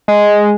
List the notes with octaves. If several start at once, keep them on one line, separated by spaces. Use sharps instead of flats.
G#3